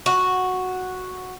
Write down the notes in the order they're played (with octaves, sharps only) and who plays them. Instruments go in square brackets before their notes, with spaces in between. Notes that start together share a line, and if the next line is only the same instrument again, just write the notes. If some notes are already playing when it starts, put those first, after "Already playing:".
[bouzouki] F#4